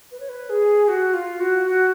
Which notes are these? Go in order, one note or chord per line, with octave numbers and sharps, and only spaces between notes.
B4
C#5
B4
G#4
F#4
F4
F#4
F#4